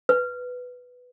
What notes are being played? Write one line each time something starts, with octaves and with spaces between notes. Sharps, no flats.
B4